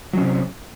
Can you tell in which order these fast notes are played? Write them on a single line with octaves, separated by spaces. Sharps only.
F#3 C#4 C3